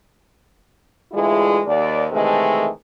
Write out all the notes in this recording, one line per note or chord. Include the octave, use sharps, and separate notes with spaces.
D2 E3 G#3 E4 F4 G#4
D#2 D5
C3 D#3 E3 G#3 A3